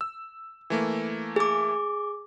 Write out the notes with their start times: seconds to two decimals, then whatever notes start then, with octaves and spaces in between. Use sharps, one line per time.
0.01 E6
0.70 E3 A3 A#3
1.36 G#4 D6